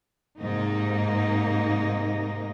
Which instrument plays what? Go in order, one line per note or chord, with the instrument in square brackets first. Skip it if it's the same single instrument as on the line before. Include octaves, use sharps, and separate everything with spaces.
[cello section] G#2 C3 A#3 D#4